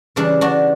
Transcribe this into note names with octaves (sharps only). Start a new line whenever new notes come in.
C#3 E3 G3 D4
D4 F#4